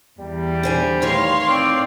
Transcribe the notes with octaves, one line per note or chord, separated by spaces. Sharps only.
E2 G3
D3 C5 G#5
A2 D#3 E3 C#5 F5 C6
C4 D5